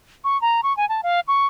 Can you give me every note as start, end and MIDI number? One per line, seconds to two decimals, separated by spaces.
0.24 0.40 85
0.41 0.61 82
0.63 0.75 85
0.77 0.88 80
0.89 1.01 81
1.03 1.20 77
1.28 1.47 85